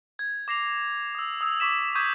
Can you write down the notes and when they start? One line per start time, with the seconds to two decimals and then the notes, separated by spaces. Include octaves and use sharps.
0.19 G#6
0.48 D6 A#6 C7 F7
1.15 D#6 E6
1.41 D#6 E6
1.60 C#6 D6 B6 E7
1.95 C#6 D#6 G6 G#6 B6